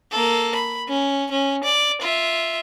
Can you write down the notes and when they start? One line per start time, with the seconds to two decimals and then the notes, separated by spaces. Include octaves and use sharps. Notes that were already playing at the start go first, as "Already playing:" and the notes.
0.12 A#3 A4
0.55 B5
0.89 C#4
1.31 C#4
1.64 D5
2.02 F4 E5